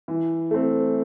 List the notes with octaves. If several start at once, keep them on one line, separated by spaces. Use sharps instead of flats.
E3
A3 C4